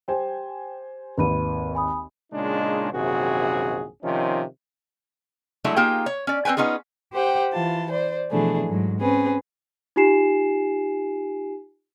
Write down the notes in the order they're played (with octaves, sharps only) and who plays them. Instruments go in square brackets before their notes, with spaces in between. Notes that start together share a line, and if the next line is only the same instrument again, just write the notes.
[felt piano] G4 C5 G#5 [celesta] G5
[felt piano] G#1 D#2 [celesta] B4 B5 D#7
[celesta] G#5 B5 D#6
[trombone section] A#2 C#3 G#3 D4 D#4 F4
A#1 F#2 C3 D#3 F#4 G#4
C3 D#3 F3 C#4 D#4 F4
[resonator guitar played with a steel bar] F#3 G#3 A3 D4 E4
A#3 D#4 F4 G4 G#4 G5
C#5
C#4 D5
C4 C#4 B4 G5 G#5
B3 C#4 D#4 F4 G#4
[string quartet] G4 C5 F#5 G5
E3 F4 A5
C5 D5
B2 E3 F3 A3 D4 G#4
G#2 F#3
C4 C#4 G#4 B4
[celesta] D#4 F4 G4 G#5 C7 E7